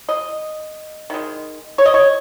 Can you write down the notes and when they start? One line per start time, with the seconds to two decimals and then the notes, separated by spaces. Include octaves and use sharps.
0.09 D#5
1.10 D#3 G#3
1.78 C#5
1.86 D#5
1.94 C#5